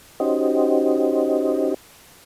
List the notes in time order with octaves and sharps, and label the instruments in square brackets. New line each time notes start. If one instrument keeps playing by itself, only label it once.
[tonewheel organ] C#4 D#4 F#4 G4 C5 D#5